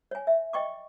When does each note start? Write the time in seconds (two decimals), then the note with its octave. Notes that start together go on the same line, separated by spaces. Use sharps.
0.11 C#5 G#5
0.27 E5
0.53 D#5 G5 C#6 D6